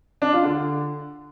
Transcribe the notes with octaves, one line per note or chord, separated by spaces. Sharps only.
D4
F4
D3